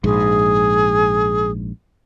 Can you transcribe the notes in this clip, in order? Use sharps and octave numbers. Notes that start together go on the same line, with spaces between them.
A#1 G#2 G#4